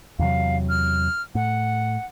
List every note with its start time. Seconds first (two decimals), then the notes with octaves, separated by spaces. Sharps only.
0.19 E2 C3 F#3 F5
0.69 F6
1.35 A2 F#5